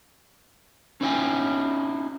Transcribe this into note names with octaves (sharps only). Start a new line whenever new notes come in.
C#4 D#4 E4 C#5 G5 G#5